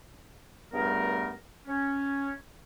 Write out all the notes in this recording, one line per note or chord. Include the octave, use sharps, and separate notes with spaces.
C#2 G2 G3 A3 B3 A#4
C#4